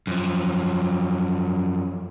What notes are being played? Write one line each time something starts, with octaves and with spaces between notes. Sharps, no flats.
F#2 F3